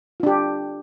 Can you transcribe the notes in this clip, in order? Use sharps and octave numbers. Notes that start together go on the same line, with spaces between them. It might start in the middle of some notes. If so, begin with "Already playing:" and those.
D4 F4 G4